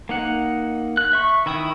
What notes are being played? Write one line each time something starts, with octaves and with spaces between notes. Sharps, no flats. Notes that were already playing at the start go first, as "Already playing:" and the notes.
A#3 D#4 F#5
F#6
E5 C#6
D#3 E4 G5 D#6